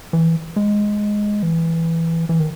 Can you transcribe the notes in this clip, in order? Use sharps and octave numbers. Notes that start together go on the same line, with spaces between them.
E3
G#3
E3
E3
D#3